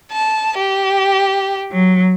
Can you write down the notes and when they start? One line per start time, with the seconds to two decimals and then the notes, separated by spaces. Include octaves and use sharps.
0.12 A5
0.57 G4
1.72 F#3